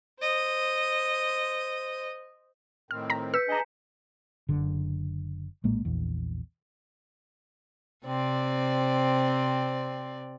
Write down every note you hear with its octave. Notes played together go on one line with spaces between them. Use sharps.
C5 D#5
A2 D#3 C4 F6
A#5 B6
B4 E6 G6 B6 C#7
D4 G#4 D#5 G#5 A#5
F#1 D3
A#1 A2 G#3 A#3
A#1 E2
C3 C4 D5